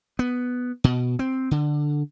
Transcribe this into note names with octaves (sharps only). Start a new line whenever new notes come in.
B3
B2
C4
D3